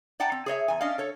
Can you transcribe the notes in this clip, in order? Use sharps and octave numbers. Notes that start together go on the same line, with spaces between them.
D5 F#5 G5 A5 A#5
C4
G#4 C#5 D#5 E5
E2 G#5
C#4 D4 D#5 F5
A4 C#5